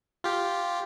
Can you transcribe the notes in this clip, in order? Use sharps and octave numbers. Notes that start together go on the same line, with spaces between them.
F4 G4